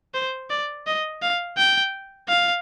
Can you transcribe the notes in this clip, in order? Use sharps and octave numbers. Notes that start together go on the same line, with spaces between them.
C5
D5
D#5
F5
G5
F5